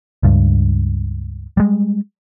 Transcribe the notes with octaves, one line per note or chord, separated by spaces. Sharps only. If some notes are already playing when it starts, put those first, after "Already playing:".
C#2 G2
G3 G#3